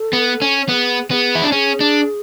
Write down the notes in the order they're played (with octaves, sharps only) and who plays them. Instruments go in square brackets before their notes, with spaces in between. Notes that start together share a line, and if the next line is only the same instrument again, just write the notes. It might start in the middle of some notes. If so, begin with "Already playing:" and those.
Already playing: [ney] A4
[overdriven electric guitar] B3
C#4
[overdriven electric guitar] B3 [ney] G#4
[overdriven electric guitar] B3 [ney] G#4
[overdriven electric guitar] E4
D4
[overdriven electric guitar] C#4 [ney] G#4
[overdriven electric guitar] D4